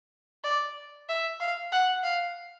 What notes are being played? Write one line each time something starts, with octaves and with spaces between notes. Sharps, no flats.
D5
E5
F5
F#5
F5